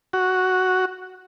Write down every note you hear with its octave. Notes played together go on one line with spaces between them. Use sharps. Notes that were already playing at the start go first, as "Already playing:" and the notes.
F#4